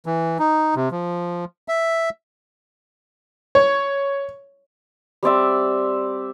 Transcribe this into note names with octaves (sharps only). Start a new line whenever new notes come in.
E3
D#4
C3
F3
E5
C#5
G3 C4 D5 E5